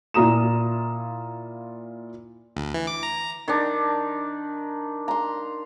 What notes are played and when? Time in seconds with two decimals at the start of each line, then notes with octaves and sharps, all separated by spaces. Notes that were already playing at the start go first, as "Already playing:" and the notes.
0.14 A#2 E4 F4 A#5 D#6 E7
2.56 D2
2.74 E3
2.87 D6
3.03 A#5
3.48 D#3 D4
5.08 A#5 C6